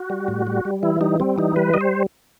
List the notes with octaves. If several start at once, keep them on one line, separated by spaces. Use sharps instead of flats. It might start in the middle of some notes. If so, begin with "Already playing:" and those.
Already playing: F#4
G3
A2
G3
G3
E3 E4
G3 D#4
G3 C4
E3 D#4
G3 B4
G3 D#5
C5